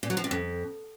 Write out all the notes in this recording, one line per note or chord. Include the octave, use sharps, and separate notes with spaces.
A#2
F#3
F3
C3
F2